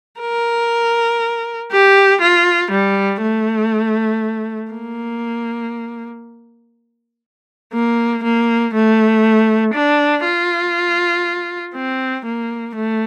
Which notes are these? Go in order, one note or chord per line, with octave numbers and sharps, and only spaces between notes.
A#4
G4
F4
G3
A3
A#3
A#3
A#3
A3
D4
F4
C4
A#3
A3